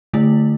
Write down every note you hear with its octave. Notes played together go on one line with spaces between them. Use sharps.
D3 A3 E4